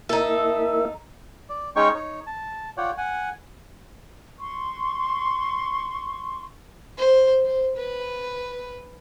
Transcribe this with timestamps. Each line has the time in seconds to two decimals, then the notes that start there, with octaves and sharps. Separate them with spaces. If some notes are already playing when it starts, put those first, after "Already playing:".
0.09 A#3 D#4 E4 A4 E5
1.49 D5
1.76 G#3 C#4 D#4 C#5 G5 C#6
1.95 D#4 C#5
2.27 A5
2.77 F4 C#5 D5 F#5 G5
2.98 F#5 G#5
4.40 C6 C#6
6.98 C5
7.46 C5
7.76 B4